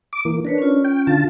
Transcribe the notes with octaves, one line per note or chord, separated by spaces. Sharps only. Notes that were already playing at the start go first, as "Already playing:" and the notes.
D6
E3 A#3
D4 A#4 B4 C#5
C#4 F4
G5
D3 F4 A5